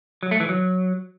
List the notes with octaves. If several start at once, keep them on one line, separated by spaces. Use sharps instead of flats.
F#3
A3
E3
F#3